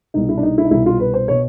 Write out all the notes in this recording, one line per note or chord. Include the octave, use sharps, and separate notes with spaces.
C2 B2 D#4
E4
D4
D#4
E4
D#4
C2 B2 E4
F4
B4
C5
B2 C#5